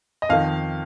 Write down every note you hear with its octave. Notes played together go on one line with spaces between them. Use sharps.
D#5
F2 D#3 F5